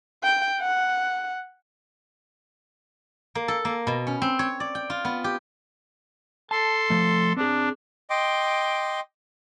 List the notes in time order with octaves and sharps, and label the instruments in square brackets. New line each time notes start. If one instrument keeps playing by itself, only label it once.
[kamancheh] G5
F#5
[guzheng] A#3
A4
A#3
B2
C#4
C4
C#5
D5
G5
F4
B3
G4
[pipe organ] A4 C6 [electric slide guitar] A5
[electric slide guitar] F3 A3
[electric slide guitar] C4 G#4 [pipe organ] D4
[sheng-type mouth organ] D#5 G5 C6 D6